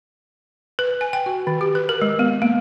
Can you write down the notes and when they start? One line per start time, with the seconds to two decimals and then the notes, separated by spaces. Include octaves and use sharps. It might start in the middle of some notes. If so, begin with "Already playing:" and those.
0.79 B4
1.01 G#5
1.13 G5
1.26 F#4
1.47 D#3
1.61 G4
1.75 B4
1.89 A#4
2.02 G#3
2.19 B3
2.42 A#3